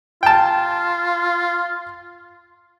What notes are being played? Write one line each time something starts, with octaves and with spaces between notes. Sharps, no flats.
F4 G5 A5